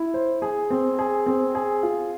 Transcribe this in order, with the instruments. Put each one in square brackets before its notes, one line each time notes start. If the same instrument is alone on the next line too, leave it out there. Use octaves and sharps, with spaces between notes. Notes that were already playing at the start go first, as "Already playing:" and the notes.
Already playing: [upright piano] E4
C5
G#4
C4
G#4
C4
G#4
F4